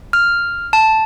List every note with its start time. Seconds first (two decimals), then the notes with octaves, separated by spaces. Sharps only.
0.13 F6
0.73 A5